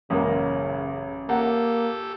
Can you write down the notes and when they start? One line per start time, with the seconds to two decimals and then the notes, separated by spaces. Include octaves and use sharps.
0.10 A1 F#2 C#3 G#3 A#3
1.29 A#3 G4 A4 F#5 A#5